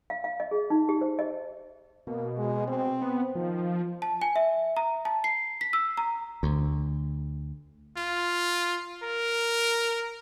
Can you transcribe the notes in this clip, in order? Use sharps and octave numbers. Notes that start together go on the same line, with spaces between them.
F5
F5
D#5
G#4
D#4
G4
C5
D#5
B2 A#3
G#3
C4
B3
D#3 F3
A5
G#5
E5
A#5
A5
C7
B6
E6
A#5
D2
F4
A#4